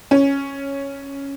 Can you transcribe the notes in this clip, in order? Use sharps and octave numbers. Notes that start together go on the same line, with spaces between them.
C#4